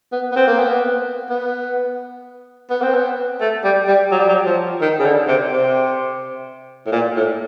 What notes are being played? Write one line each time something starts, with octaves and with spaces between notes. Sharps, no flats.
B3
B3
C4
A#3
B3
B3
B3
C4
B3
A3
G3
G3
F#3
G3
F#3
F3
D#3
C#3
D3
C3
C3
A2
A#2
A2